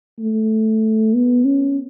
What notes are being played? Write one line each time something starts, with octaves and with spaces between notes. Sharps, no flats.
A3
B3
C#4